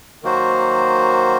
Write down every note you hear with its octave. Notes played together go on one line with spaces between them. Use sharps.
D#3 F#3 A#3 F#4 C5